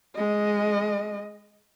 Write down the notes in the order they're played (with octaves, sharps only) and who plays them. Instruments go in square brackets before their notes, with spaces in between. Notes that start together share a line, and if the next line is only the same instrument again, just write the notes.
[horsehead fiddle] G#3 D#5